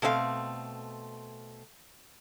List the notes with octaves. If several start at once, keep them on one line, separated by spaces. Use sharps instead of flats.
B2 A3 C4 C5 F5